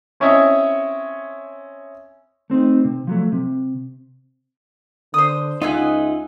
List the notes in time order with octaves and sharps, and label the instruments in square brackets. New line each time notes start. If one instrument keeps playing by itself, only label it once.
[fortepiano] C4 C#4 E4 C#5 D#5 E5
[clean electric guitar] A3 C4 D#4
C3
F3 F#3 A3
C3
[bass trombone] D3 [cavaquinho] C5 D#6
[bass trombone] C#2 [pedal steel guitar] D#4 F#5 [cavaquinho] F4 E5 G#5